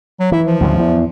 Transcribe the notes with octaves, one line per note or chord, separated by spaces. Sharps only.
F#3
E3 E4
F3
D2 G#2 C#3
E2